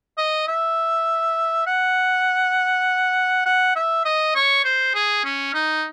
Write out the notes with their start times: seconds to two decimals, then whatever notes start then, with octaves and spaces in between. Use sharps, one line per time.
0.18 D#5
0.47 E5
1.67 F#5
3.46 F#5
3.76 E5
4.05 D#5
4.35 C#5
4.65 C5
4.95 G#4
5.24 C#4
5.54 D#4